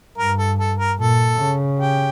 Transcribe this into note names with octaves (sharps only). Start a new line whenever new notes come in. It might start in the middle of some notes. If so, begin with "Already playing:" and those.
G2 A#4
A4
A4
A#4
A#2 A4
C#3
G4